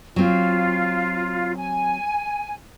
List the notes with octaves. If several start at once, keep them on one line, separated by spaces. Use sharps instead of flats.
F#3 C4 F4
G#5